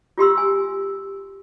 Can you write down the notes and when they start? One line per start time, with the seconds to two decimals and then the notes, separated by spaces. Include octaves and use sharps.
0.18 F4 G4 C6 E6
0.38 G#5